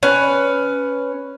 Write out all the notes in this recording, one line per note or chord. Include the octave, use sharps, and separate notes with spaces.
C#4 B4